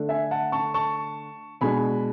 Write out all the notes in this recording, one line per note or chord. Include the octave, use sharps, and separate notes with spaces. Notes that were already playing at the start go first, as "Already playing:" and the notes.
Already playing: D3 A3 D4
E5 G#5
F#5 A5
A5 C#6
A5 C#6
B2 G#3 D4 G#5 B5